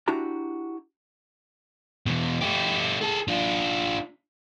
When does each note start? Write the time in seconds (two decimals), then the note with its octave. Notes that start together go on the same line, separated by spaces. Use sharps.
0.08 D4 E4 F#4 G4 A#5
2.07 E2 B2
2.41 A3 G4
3.01 G#4 A4
3.28 D4 F4